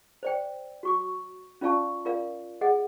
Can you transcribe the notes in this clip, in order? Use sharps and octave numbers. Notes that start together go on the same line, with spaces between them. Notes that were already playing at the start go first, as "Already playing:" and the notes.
C5 D5 G5
F#4 C#6 D6
C#4 F4 D5 F5 A5 C#6
F4 A#4 D5 F5
G#4 D#5 F#5